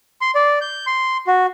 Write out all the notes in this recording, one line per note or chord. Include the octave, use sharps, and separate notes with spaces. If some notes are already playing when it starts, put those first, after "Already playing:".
C6
D5
G6
C6
F#4